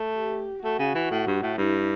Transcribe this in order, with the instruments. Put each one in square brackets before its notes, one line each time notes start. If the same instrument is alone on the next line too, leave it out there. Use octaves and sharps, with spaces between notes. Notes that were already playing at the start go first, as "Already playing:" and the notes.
Already playing: [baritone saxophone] A3
[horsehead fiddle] G4
[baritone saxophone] A3 [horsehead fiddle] F#4
[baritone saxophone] C#3
E3
A2
G2
A2
[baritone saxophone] G2 [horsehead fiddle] E4